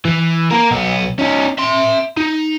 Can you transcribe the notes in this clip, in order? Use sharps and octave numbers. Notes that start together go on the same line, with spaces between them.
E3
A#3 A#4
B1 B3
C#4 D#4
E5 C6
D#4